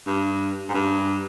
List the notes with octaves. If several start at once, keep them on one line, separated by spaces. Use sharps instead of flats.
G2
G#2
G2